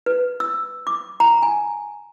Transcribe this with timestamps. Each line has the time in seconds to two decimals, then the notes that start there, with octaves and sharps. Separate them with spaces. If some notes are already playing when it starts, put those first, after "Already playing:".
0.06 B4
0.40 E6
0.87 D6
1.20 A#5
1.42 G#5